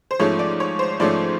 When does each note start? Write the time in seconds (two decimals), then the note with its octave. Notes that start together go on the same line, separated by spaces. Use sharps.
0.11 C5
0.19 G#2 F3 A3 C#4 C#5
0.39 D5
0.60 C#5
0.79 C5
1.00 G#2 F3 A3 C#4 D5